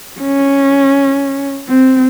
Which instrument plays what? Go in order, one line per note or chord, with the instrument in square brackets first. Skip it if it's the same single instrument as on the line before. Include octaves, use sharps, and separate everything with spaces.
[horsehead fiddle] C#4
C4